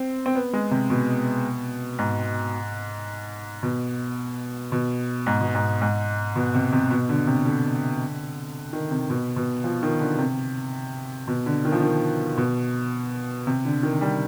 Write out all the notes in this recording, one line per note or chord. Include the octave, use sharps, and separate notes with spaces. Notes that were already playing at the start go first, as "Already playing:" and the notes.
Already playing: C4
C4
B3
G#3
C3
B2
G#2
B2
B2
G#2
B2
G#2
G#2
B2
C3
C3
B2
D3
C3
D3
D#3
C3
B2
B2
F3
D#3
D3
C3
B2
D3
D#3
F3
D#3
B2
C3
D3
D#3
G3